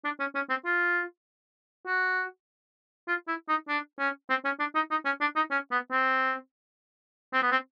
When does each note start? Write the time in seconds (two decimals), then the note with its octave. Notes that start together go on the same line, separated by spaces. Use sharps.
0.05 D4
0.20 C#4
0.35 C#4
0.50 C4
0.65 F4
1.87 F#4
3.08 F4
3.28 E4
3.49 D#4
3.69 D4
3.99 C#4
4.30 C4
4.45 C#4
4.60 D4
4.75 D#4
4.91 D#4
5.06 C#4
5.21 D4
5.36 D#4
5.51 C#4
5.71 B3
5.91 C4
7.33 C4
7.42 B3
7.52 C4